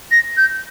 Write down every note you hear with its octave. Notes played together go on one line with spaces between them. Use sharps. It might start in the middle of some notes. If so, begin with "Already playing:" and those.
A#6
G6